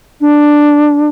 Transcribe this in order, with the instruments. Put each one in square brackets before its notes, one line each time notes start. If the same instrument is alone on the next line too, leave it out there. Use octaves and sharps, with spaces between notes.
[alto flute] D4